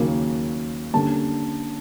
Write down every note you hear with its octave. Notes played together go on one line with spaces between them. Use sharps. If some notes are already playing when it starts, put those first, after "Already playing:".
Already playing: D#2 C#3 F#3 A#3
D3 G3 A#3 C#4 A5